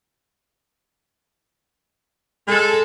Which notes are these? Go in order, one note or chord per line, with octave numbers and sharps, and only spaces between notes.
G#3 A4